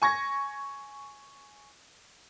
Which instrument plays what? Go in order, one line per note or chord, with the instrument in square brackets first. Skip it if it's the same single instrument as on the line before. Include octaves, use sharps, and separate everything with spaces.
[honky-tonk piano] G#5 C#6 G#6 A#6